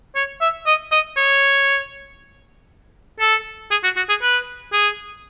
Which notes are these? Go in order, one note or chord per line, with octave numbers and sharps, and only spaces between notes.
C#5
E5
D#5
D#5
C#5
A4
G#4
F#4
F#4
G#4
B4
G#4